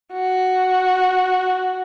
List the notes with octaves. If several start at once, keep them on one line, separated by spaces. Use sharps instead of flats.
F#4